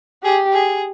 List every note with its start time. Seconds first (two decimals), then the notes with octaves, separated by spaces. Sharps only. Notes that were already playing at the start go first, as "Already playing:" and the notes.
0.24 G4 G#4
0.53 G#4